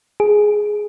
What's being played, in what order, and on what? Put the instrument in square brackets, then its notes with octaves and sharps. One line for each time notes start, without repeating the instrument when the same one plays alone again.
[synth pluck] G#4